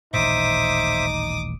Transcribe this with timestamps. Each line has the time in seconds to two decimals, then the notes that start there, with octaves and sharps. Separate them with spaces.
0.14 D#1 A1 A#2 D#4 C5 E5 D6 D#6